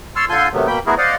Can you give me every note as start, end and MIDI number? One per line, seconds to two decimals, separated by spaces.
0.16 0.25 73
0.16 0.25 81
0.16 0.25 84
0.16 0.25 88
0.16 0.25 89
0.29 0.48 50
0.29 0.48 65
0.29 0.48 69
0.29 0.48 80
0.29 0.48 84
0.29 0.48 91
0.53 0.67 48
0.53 0.67 51
0.53 0.67 54
0.53 0.67 57
0.53 0.67 59
0.67 0.79 47
0.67 0.79 58
0.67 0.79 79
0.67 0.79 83
0.67 0.79 91
0.86 0.95 57
0.86 0.95 59
0.86 0.95 64
0.86 0.95 66
0.86 0.95 68
0.86 0.95 70
0.98 1.15 72
0.98 1.15 74
0.98 1.15 75
0.98 1.15 77
0.98 1.15 78